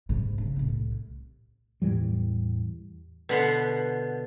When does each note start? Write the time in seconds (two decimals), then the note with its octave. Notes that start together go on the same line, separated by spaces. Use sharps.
0.09 G#2 C3
0.38 C#3
0.56 C2 A2
1.82 E2 A2 E3 G3
3.29 B2 D3 B3 F#5 B5 C6